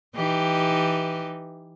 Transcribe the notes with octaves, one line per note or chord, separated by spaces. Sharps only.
E3 D#4 G4